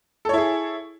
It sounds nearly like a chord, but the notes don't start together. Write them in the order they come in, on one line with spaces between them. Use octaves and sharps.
A4 C#5 E4 G#4